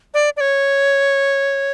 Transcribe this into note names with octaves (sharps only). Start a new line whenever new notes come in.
D5
D5
C#5